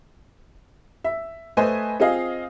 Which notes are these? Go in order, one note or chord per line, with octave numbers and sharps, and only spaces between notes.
E5
A3 B4 C5 D#5 G#5
C4 F4 G#4 D#5 F5